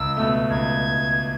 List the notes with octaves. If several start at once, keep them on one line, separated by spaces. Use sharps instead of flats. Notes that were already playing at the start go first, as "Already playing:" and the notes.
Already playing: C#2 E6
B2 A3
C#2 G#6